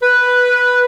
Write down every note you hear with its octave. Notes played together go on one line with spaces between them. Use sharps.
B4